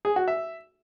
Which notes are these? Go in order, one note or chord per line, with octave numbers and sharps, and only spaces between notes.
G#4
F#4
E5